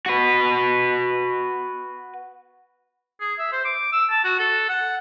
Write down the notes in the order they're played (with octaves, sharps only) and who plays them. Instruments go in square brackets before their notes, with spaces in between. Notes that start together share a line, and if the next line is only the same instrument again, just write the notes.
[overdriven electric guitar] F#4 B4
[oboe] G#4
E5
C5
D6
E6
A5
F#4
A4
F#5